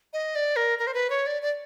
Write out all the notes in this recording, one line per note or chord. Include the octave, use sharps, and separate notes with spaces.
D#5
D5
A#4
A#4
C5
B4
C#5
D5
D5